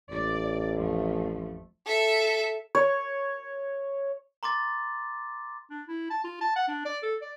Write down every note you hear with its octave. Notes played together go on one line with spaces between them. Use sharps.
A1 D5
F2 F3 A3
A4 E5
C#5
A#5 C6 D6 A6
D4
E4
A5
F4
A5
F#5
D4
D5
A4
D5